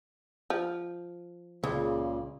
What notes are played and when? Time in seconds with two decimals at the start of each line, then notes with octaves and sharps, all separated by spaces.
0.50 F3
1.64 C#2 A#2 C#3